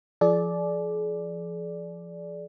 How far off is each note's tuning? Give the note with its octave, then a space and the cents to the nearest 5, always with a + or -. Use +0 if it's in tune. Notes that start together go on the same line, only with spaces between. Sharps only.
F3 -20 G#4 +45 D5 +0